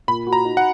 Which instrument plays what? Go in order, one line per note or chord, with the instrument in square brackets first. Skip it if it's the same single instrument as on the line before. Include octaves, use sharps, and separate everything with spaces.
[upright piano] A#2 [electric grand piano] B5
[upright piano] F#4
[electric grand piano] A#5
[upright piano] D#4
[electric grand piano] F#5